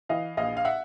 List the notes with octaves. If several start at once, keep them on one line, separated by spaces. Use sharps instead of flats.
E3 D#5 F5
A#1 D#5 F5
F5
E5 F#5